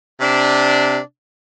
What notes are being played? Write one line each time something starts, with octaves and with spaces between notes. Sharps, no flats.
C3 D4